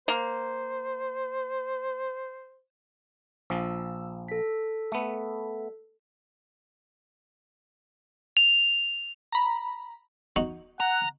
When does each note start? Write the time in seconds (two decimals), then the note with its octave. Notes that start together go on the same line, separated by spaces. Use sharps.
0.08 A#3 C5
3.50 A#1 F3 E6
4.28 A4 B6
4.92 A3 B3
8.37 F7
9.32 A#5 B5
10.36 D#4 F#4 C#6
10.80 F#5 A#5